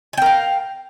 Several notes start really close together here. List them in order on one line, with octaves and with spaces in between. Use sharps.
G#5 G5 A#4 F5